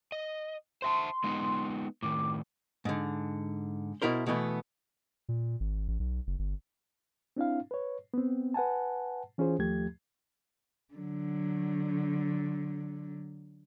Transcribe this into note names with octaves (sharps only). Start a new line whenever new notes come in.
D#5
C5 E5 A5 C6
G#3 B3 D#4
A2 D#3 D6
G#2 D3
B2 E4 A#4 C5
B2 E3 A3 B3
A#2
G#1
A1
B1
F#1
G1
C4 D4 E4 F5
B4 C#5
B3 C4
B4 F#5 G#5 A5
E3 C#4 F4 G#4 C5
D#2 F3 A3 G4 G#6
D3 F#3